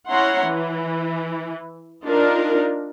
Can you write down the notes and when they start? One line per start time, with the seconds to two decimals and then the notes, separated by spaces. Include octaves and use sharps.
0.10 C#4 E4 C#5 F#5 A#5 C6
0.47 E3
2.05 D4 D#4 F4 A#4